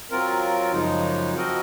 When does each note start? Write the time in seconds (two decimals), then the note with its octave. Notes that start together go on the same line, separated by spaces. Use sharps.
0.11 F#3 C4 F4 A#4
0.72 F#2 C#3 F3 G#3 D#4
1.34 F3 C4 F#4 A#4 D#5